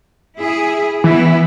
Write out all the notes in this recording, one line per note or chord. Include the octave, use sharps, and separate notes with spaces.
E4 G#4
E3 B3 E4